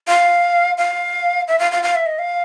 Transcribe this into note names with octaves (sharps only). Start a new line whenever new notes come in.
F5
F5
E5
F5
F5
F5
E5
D#5
F5